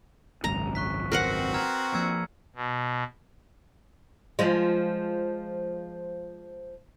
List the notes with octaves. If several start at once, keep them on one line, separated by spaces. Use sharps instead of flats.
G#1 C#2 F#2 A#5
C#6 F#6 B6
C4 F#4 A#4 B4 F#5 A#6 C7 F#7
A#5 F6 G#6
F3 A#3 E6 G#6 C#7
B2
F3 G#3